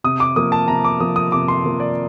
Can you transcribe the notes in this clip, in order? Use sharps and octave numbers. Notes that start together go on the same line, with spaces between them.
C3 D#6
D6
F3 A#3 D#6
A5
C3 A#5
D6
F3 A#3 D#6
D#6
C3 D6
C6
F3 A#3
D5